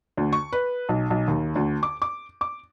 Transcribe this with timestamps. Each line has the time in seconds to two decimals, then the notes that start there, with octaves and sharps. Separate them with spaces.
0.17 D2
0.33 C#6
0.53 B4
0.89 B1
1.10 B1
1.28 D#2
1.56 D2
1.83 D6
2.02 D6
2.41 D6